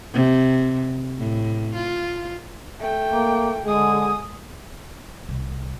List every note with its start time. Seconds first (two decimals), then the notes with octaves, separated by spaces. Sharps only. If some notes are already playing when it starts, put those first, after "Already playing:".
0.14 C3
1.19 A2
1.75 F4
2.80 A3 G5
3.11 A#3
3.65 D3 G#3 G#4 D#6
5.29 C2